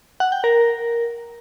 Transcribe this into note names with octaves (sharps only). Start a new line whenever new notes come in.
F#5
G5
A#4